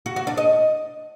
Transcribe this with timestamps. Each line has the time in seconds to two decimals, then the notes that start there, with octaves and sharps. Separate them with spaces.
0.06 F#4
0.16 F#4
0.27 D4
0.37 D#5